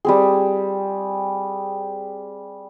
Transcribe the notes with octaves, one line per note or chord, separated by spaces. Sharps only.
G3 C4 G#4